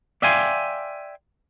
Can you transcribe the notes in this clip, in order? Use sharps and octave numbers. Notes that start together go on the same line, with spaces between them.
D5 E5 F5 G5 G#5 C6